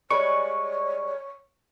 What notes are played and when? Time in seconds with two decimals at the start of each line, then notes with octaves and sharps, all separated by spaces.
0.10 G3 G#3 B4 C#5 C#6